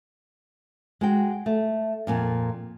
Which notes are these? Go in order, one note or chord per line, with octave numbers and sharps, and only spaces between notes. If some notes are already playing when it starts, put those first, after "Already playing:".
G#3 F#4 G5
A3
F2 A#2 G#5